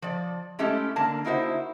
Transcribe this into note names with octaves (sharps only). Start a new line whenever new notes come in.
F3 D5
G#3 A3 C#4 E4 G4 A4
D3 A#3 A5
A#3 D#4 E4 F#4 C5 E5